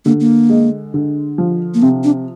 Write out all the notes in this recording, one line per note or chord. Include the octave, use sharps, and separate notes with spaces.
D3 A#3
A#3
G#3
D3
F3
A#3
C3 C4
D4